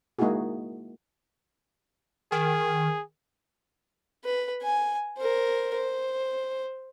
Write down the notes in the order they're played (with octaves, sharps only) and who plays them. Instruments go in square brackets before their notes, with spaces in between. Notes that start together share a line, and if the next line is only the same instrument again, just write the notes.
[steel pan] G#3 A#3 D#4 E4 F#4 G#4
[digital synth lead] D#3 [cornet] G#4
[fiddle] B4
G#5
A#4 C5
C5